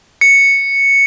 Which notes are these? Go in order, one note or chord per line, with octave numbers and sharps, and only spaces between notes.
C#7